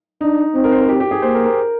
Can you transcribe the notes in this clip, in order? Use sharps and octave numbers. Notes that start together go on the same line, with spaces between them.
D4 D#4
C4 D#4
A#4
C5
A#4
G4
G4
G#4
A#3 C5
A#4
A#4